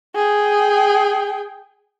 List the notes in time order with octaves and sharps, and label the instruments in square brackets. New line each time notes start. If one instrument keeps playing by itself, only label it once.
[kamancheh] G#4 G5